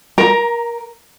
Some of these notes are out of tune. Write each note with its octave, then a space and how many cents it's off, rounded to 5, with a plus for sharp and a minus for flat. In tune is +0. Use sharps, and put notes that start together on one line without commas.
A#4 +20 A#5 -5